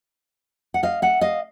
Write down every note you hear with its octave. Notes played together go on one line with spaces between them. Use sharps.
F#5
D#5 F5
E5 F#5
D#5 F5